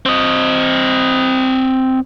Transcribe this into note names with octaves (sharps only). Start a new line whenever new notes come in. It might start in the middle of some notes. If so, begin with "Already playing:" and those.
C4 D#5